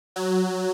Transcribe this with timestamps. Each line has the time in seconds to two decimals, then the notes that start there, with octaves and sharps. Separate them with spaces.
0.16 F#3